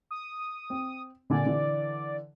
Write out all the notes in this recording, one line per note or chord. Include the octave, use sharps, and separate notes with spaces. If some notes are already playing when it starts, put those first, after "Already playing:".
D#6
C4
A#2 D3 D5 G#5
D3 E3